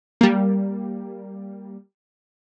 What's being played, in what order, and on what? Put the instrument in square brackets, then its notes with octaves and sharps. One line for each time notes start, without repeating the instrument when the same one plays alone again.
[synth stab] G3 A#3